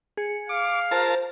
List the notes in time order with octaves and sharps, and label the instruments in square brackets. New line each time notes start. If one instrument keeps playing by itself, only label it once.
[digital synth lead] G#4 [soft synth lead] C#7
[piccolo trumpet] F5 [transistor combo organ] D6
[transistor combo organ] F4 A#4 A5 [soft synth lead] C5